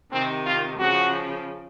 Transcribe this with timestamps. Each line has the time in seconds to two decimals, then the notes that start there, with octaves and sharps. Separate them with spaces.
0.12 C3 D#3 C4
0.46 F4
0.79 C#3 F3 F#4